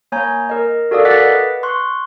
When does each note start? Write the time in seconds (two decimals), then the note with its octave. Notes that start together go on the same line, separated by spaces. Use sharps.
0.12 A#3 C#5 G#5 A#5 G6
0.49 A#4 D#5
0.91 F#4 A4 A#4 D5 F5 D#6
1.05 D#5 F#5 D6 F#6 A6 B6
1.23 B4
1.63 C6 C#6 F#6